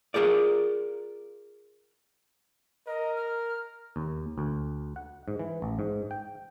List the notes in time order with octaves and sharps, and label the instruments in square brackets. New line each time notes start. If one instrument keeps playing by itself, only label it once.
[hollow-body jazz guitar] F4 G#4 A#4 D5
[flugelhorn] A#4 [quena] D#5
[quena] F6
[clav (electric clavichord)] D#2
D2
F#5
G#2
E3
A1
G#2
G5